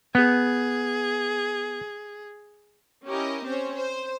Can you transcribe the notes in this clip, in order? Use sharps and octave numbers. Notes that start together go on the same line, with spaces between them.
B3 G#4
C#4 E4 G4 A#4 D#5
C4 C#4 C5 C#5
C5